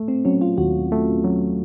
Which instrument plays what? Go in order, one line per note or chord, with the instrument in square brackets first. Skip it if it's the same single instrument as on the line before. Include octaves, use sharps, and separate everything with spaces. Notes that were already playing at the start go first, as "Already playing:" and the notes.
Already playing: [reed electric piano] A3
[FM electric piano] C4
[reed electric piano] F#3 [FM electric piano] C#4
[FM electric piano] F4
[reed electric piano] D#2 [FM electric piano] F#4
[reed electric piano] A3
F#3